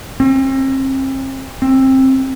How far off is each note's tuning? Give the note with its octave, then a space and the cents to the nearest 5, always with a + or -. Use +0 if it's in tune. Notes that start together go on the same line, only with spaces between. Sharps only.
C4 +40
C4 +20